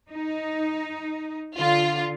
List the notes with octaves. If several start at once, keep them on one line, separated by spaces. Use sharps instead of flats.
D#4
D3 F4